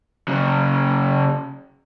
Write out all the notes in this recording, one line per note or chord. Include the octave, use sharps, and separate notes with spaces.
C#3 F#3